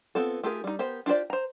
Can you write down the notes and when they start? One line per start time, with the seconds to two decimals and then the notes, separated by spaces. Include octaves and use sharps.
0.15 B3 C4 F4 A4
0.43 A3 F4 G4 G#4 A#4
0.64 G3 D#4
0.79 B3 G4 A#4 C5
1.06 D4 F4 G4 C5 D5
1.30 C5 A#5